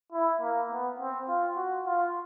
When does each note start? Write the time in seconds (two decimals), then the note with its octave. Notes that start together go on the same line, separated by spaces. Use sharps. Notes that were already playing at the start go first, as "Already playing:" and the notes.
0.12 E4
0.41 A#3
0.71 B3
1.00 C4
1.29 F4
1.57 F#4
1.86 F4